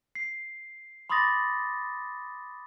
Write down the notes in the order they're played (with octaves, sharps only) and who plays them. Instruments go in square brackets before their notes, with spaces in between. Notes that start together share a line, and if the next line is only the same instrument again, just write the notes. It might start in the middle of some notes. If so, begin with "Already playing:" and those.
[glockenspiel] C7
B5 C6 D6 D#6 A6 A#6